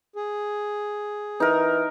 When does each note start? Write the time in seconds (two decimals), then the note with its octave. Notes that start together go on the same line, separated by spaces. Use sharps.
0.16 G#4
1.40 E3 D#4 A#4